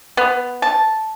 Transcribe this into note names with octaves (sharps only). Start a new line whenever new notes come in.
B3
A5